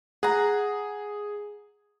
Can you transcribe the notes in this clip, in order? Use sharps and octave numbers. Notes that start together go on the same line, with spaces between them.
G#4 F#5 A#5